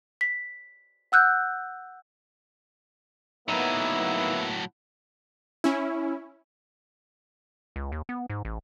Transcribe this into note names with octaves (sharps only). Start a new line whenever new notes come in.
B6
F#5 E6 F#6 G6
A2 F#3 A#3 B3 D#4 E4
C#4 E4
C#2
D#2
B3
G#2
A1